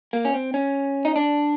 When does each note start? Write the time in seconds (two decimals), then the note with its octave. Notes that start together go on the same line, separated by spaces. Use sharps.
0.13 A#3
0.25 C#4
0.34 C4
0.54 C#4
1.05 D#4
1.16 D4